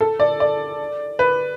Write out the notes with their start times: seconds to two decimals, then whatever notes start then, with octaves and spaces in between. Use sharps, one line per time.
0.01 A4
0.20 D5
0.40 D5
1.19 B4